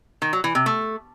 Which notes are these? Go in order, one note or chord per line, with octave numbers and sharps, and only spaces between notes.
D#3
F#3
E3
C3
A3